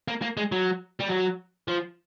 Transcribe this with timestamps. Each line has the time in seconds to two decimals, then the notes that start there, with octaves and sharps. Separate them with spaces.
0.08 A#3
0.22 A#3
0.37 G#3
0.52 F#3
1.00 G3
1.09 F#3
1.68 F3